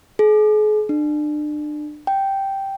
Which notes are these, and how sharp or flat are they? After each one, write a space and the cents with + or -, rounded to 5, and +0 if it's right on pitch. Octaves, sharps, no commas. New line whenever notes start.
G#4 +40
D4 +35
G5 -5